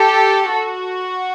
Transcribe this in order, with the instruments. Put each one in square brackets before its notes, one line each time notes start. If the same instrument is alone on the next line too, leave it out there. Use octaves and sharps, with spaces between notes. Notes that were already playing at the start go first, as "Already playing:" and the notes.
Already playing: [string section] G4 A4
F#4